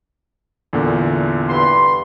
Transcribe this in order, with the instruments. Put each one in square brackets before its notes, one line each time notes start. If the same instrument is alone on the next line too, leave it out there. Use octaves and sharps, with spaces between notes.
[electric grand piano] E2 A#2 D3
[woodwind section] G2 B5 C6